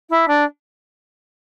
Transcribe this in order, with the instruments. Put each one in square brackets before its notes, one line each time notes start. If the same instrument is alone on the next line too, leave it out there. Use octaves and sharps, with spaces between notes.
[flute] E4
D4